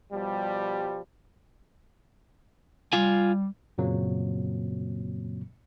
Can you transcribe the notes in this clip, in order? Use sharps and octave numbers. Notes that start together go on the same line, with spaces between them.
B2 F3 G3
G3 F4 G#5
F#2 A#2 C#3 F#3 A#3 C4